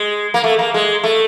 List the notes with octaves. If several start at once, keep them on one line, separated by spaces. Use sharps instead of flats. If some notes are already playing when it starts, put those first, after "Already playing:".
Already playing: G#3
A#3
A3
A#3
G#3
A3